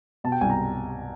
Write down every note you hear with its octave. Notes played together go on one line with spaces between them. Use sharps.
B2 A5
G5
C2 G#5
A#5